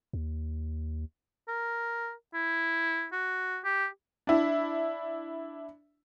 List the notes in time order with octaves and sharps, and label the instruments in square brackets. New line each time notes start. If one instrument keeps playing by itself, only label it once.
[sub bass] D#2
[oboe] A#4
E4
F#4
G4
[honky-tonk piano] D4 E4